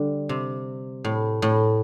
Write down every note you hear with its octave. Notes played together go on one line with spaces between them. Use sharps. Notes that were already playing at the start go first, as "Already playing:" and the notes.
Already playing: D3 G3
C3
A2
A2